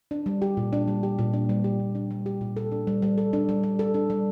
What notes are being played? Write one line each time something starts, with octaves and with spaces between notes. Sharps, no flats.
D4
G3
G4
A#2
D4
G3
G4
A#2
D4
G3
G4
A#2
D4
G3
G4
A#2
A4
D4
G3
G3
A4
D4
G3
G3
A4
D4
G3